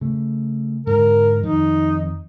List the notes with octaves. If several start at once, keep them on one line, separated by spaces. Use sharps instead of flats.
C#3 A3
G#2 D3 A#4
F2 D#3 D#4